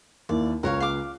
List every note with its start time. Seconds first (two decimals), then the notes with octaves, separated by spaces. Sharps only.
0.29 D#2 A#3 E4 D5
0.63 C#2 A#4 C#5 F5 F#6
0.80 F5 D6